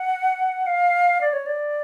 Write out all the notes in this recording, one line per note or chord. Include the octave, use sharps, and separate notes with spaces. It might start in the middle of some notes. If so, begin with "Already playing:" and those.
Already playing: F#5
F5
D5
C#5
D5